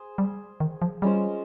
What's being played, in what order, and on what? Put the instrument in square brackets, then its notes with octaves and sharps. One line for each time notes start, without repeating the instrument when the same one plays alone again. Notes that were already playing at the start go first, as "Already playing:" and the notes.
Already playing: [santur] G#4 C5
[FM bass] G3
D#3
F3
[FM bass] G3 [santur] G#3 C#4 F4 C5